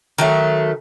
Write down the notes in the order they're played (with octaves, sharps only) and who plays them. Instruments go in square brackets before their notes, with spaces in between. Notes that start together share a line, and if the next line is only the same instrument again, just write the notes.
[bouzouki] D#3 F#3 A3